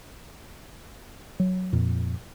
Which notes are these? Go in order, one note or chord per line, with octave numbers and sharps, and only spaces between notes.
F#3
F2 A#2